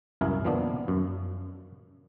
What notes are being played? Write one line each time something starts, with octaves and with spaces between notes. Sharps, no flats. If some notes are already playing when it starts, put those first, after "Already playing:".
C2 F#2 E4 A#4 F5 G#5
D#3 F3 A#3 B3 D4
F#2